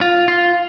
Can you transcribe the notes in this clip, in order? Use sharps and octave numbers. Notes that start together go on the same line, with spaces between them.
F4
F4